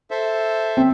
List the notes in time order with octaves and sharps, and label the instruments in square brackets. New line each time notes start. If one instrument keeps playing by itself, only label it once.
[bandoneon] A4 C5 E5
[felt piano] C4